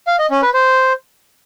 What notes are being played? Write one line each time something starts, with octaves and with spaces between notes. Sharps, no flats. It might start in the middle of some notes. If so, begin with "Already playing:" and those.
F5
D#5
C#4
B4
C5